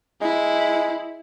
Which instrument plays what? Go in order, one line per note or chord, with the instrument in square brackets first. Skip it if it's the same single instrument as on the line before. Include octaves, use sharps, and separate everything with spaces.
[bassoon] G#3 [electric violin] E4